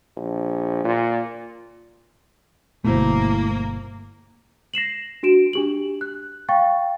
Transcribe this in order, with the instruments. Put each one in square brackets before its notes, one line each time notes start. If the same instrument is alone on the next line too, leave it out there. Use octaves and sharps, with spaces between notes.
[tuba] A#1
A#2
[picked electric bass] G1 B2 [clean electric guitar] A3 E4 C5 [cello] A#3
[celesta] A#6 C7 E7 F#7
D4 F#4 D7 E7
D4 G4 F#7
F#6
F5 G5 C#6 A6